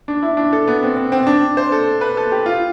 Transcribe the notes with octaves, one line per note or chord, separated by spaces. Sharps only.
D4
E4
D4
A4
B3
C4
C4
C4
D4
C5
A4
B4
A4
G4
F4